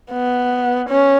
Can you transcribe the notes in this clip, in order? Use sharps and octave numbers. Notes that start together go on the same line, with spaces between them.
B3
C#4